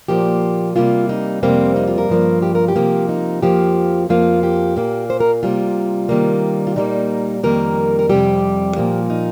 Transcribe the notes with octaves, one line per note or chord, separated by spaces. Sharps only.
A#2 F3 A#3 G4
C3 G3 A#3 F4
D#4
F2 C3 G3 A#3 C4
D#4
F4
A#4
G2 F3 A#3
G4
A#4
G4
C3 F3 A#3
D#4
F2 F3 A#3 G4
F2 F3 A#3 F4
G4
A#2 A#3
C5
A#4
C3 G3 A#3 F4
C3 D#3 G3 A#3
F4
A#2 G3 A#3 D#4
F2 D#3 G3 A#3 A#4
A#4
F2 C3 G3 G4
A#2 F3 A#3
D#4